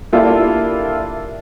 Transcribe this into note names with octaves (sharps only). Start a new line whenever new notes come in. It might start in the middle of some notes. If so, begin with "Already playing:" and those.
A#3 D4 E4 F4 G4 A4